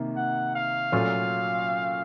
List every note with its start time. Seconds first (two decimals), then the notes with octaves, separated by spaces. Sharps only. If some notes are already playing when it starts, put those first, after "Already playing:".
Already playing: C3 D#3 A#3
0.16 F#5
0.55 F5
0.92 A#2 F#3 A3 C#4 F4